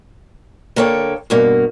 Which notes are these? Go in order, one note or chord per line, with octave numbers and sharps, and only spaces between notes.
D3 A#3 A4 C#5 G5
G2 B2 A#3